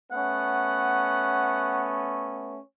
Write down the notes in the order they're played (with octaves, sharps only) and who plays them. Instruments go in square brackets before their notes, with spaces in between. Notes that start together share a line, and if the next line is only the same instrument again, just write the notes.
[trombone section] A3 B3 C#4 [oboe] F#5